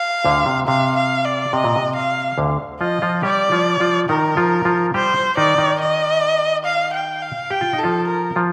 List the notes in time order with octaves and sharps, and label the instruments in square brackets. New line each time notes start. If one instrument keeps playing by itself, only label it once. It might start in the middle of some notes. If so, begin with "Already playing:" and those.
Already playing: [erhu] F5
[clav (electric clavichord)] D2 D3
C3
[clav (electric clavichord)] C3 [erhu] F5
[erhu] F5
D5
[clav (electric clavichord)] C3 [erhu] D#5
[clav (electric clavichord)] A#2
C3
[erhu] F5
[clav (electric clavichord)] D2 D3
[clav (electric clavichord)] F3 F4 [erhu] D#5
[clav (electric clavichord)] F3 F4
[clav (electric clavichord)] G3 G4 [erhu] D5
[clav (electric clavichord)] F3 F4
F3 F4
[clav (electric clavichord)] D#3 D#4 [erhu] A#4
[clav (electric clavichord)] F3 F4
F3 F4
[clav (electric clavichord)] G3 G4 [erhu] C5
[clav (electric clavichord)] D#3 D#4 [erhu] D5
[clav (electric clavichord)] D#3 D#4
[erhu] D#5
F5
G5
F5
[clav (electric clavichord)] G4 [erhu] G5
[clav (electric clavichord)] F4
D#4
[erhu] A4
[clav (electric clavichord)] F3 F4
[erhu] A#4
[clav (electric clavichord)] F3 F4